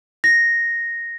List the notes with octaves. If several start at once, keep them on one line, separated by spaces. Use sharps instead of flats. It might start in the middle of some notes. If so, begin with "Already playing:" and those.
A#6